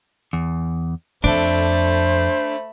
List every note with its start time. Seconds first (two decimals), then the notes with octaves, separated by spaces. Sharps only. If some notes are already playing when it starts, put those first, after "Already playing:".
0.33 E2
1.24 F2 A3 D4 A4 C5 B5